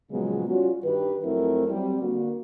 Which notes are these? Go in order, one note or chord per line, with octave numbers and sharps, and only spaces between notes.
A#2 C#3 F3 F#3 G#3 B3
G3 C#4 F4 F#4
G2 D#3 G4 B4
F2 F#3 A3 C4 E4 A#4
F#3 G3 C4
D3 A#3 F#4